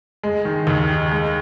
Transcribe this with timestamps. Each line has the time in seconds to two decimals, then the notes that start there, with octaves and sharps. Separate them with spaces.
0.23 G#3
0.45 D#3
0.67 D#2
0.90 D#4
1.12 G#3